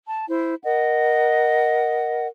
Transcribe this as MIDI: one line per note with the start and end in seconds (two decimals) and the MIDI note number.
0.08 0.25 81
0.29 0.56 64
0.29 0.56 72
0.64 2.27 70
0.64 2.27 75
0.64 2.27 78